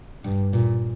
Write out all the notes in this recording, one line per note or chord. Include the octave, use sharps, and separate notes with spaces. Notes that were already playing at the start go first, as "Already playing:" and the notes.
G2
A#2